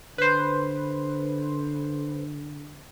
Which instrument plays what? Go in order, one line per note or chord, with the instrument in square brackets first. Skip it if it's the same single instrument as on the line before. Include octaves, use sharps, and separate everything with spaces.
[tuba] D3 [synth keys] B4 C5